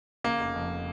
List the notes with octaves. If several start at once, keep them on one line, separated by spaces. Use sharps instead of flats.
C#3 A#3
F1
F2